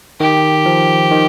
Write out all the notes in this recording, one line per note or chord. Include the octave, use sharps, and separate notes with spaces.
D#3 G4
F3
D#3